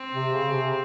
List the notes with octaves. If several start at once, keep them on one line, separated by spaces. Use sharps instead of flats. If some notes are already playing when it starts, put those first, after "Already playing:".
Already playing: C4
C3
C#3
C3